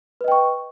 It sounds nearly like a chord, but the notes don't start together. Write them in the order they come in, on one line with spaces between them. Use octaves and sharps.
B4 D#5 G5 C#6